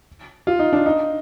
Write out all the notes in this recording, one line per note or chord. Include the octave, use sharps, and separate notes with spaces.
F4
D#4
D4
D#4